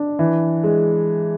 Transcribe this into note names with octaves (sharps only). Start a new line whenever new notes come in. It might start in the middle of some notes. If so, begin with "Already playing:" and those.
Already playing: D4
E3
G#3